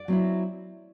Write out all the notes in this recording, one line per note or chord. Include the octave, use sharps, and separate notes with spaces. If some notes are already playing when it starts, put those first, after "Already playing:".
Already playing: D5
F#3 C4 E4